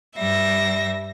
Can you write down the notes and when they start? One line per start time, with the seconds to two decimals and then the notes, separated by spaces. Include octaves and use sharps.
0.17 G2 G3 E5 A#6